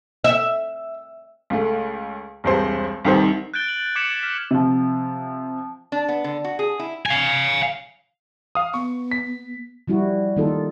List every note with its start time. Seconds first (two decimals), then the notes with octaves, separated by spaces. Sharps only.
0.24 E5
1.50 C#2 A3
2.44 E1 C2 C5
3.05 C2 D#3 C5
3.54 F#6 G6 A6 D7 G7
3.68 F#7
3.96 D6 G#6 B6 C#7 D7 E7
4.23 F6 B6 E7
4.51 C3 F3
5.92 D4
6.09 B3
6.24 D3
6.44 F#4
6.59 G#4
6.79 E4
7.06 F5 G#5
8.55 F5 D#6
8.74 B3 C#6
9.11 B6
9.88 F3 G3 E4 F#4
10.37 D#3 A#3 D#4 F4 A4